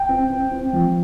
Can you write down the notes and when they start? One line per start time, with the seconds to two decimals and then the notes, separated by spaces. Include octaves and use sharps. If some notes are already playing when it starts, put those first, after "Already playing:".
Already playing: G5
0.09 C4
0.30 C4
0.52 C4
0.73 F3